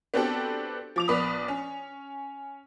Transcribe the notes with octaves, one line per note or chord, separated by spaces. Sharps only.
B3 C4 D4 F#4 G4 A4
F3 D6 F7
A#1 B3 D5 B5 D#6
C#4